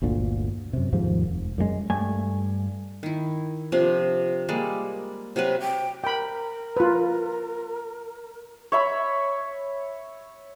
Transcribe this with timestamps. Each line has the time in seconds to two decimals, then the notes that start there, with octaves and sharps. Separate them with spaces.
0.02 G1 D2 A#2 D3
0.73 F#2 C3
0.92 D#2 G#2 F3
1.24 F1
1.58 F#2 C#3 G#3
1.90 G2 A3 G#5
3.03 D#3 E4
3.72 C3 F3 C4 D4
4.48 G3 G#3 A#3 D5
5.36 C3 F#3 C4 B4
5.62 G5
6.04 A#4 G5 B5
6.77 F4 B4
8.72 C#5 E5 B5